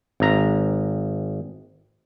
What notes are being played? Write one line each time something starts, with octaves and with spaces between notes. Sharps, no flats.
G#1 A#5